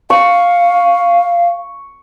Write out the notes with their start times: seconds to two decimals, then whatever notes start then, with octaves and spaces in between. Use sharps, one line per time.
0.10 F5 C#6